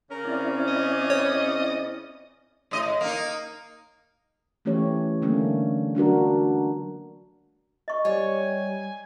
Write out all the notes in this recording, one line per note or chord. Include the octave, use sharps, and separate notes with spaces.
C#3 C#4 A#4
C4 E4 D5
D#5
C#5
A2 D#5
A#3 D#4
E3 A3 C#4 G4 C#5
D3 G3 A3 A#3 C#4
F#3 D4 F#4 A#4
D#5 C#6
G3 C#5 G#5